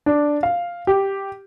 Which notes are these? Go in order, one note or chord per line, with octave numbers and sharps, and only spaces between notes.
D4
F5
G4